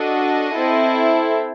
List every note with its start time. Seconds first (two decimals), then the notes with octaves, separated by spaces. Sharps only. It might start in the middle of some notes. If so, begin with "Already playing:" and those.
Already playing: D4 F#4 A4 D#5
0.53 C4 E4 A4